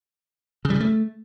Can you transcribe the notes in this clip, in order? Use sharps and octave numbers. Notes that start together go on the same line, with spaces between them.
C#3
G3
C#3
A3